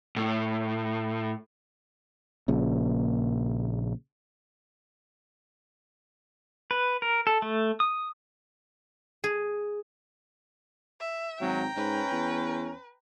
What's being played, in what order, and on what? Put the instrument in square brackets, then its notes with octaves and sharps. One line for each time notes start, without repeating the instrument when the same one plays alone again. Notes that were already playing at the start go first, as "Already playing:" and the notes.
[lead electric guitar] A2
[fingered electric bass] A#1 A#2 C#3
[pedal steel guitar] B4
A#4
A4
A3
D#6
[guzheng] G#4
[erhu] E5
[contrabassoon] G#1 [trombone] F#3 [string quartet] G5 A#5
[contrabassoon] G#2 [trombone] C#4 [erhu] B4
[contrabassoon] E2